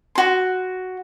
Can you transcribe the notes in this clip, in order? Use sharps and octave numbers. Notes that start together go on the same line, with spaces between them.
F#4 C6